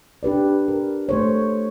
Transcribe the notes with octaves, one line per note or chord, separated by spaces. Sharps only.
D4 G4 B4 D5
A#4
A3 C5 C#5